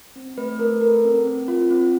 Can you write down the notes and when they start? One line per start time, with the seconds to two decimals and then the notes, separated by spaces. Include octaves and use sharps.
0.16 C4
0.37 A3 B4
0.59 A3 A#4
0.81 A4 A#4
1.04 C4
1.26 C4
1.48 F4
1.70 C4